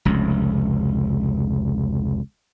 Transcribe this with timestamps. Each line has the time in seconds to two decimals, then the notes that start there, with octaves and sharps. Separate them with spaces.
0.05 F1 C#2